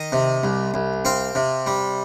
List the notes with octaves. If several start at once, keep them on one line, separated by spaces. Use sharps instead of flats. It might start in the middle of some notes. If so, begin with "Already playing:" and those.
Already playing: D#3 D#5
C3
C2
C2
C4 F5
C3
G3